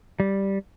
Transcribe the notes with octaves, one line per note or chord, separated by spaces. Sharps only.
G3